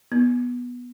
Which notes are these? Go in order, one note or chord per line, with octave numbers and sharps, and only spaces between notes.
B3